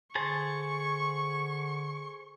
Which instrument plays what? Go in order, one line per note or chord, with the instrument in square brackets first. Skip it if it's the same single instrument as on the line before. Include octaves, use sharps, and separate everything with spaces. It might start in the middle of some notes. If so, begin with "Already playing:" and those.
[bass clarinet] D3 [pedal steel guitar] G#4 C5 A5 [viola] C#6